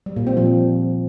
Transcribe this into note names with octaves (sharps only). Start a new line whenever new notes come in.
G3
A#2
C4
F3